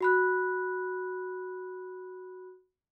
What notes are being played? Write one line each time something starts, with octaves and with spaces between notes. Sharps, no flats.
F#4 B5 F#6